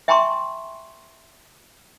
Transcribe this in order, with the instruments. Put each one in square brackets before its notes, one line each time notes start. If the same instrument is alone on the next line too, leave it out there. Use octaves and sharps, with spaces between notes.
[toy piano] E5 G5 G#5 A#5 C6 C#6